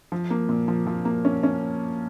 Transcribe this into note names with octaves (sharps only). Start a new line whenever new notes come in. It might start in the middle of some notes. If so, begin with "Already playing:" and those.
F3
A#3
A#2
F3
F3
A#3
C#4
C#4